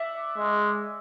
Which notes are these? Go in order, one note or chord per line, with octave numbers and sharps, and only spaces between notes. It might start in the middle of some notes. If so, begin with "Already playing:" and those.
Already playing: D5 E5 F#5
G#3